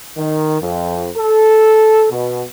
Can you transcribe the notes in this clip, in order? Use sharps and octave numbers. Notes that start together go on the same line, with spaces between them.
D#3
F2
A4
B2